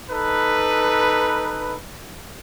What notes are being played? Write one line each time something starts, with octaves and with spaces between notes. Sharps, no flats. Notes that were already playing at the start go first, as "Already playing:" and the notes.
D#4 A4 B4